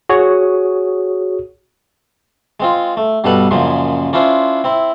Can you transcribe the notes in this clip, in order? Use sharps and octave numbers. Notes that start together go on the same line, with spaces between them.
F#4 G#4 C#5 D#6
G#3 C4 F4
A3
G2 B2 G3 A4 B4 B5
F#2 A#2 C#3 F3 G#3
C#4 D4 E4 F4 C5
C4 E4